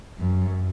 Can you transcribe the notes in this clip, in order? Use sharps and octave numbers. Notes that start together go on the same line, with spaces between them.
F#2